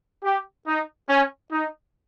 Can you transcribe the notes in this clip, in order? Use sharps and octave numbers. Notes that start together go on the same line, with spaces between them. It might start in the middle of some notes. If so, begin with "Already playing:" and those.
G4
D#4
C#4
D#4